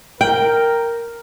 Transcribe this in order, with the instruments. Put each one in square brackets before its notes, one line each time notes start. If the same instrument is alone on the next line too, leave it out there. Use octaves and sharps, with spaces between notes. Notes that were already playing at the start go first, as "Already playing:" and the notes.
[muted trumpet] A#4 [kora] G5